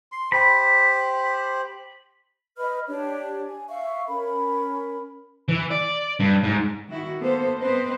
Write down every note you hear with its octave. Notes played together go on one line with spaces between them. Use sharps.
C6
G4 C5 B5
B4 D#5 B5 F6
D4 G4 C#5
G#5
E5 F5 C#6
C#4 A#4 B5
E3
D5
G2
G#2
D#3 A#3 E4 F#4
A#3 B3 A4 C5
B3 C4 B4 C5 D#5